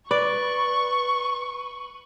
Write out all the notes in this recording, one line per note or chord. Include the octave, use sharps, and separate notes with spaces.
B4 D5 C#6